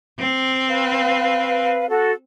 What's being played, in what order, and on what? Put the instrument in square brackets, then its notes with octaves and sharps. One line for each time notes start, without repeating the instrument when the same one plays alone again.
[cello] C4
[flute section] B4 F5
F#4 A4